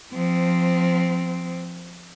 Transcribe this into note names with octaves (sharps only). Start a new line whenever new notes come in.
F3 C4